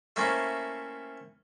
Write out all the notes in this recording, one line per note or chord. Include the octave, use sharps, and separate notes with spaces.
A3 A#3 C4 C#4 E4